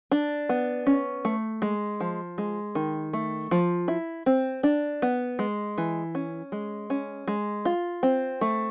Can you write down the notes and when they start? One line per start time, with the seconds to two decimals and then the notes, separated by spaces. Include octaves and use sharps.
0.12 D4
0.49 B3
0.86 C#4
1.25 A3
1.62 G#3
2.00 F3
2.38 G#3
2.75 D#3
3.13 A3
3.51 F3
3.88 E4
4.26 C4
4.63 D4
5.02 B3
5.39 G#3
5.78 E3
6.15 C#4
6.52 G#3
6.90 C#4
7.28 G#3
7.65 F4
8.03 C4
8.41 A3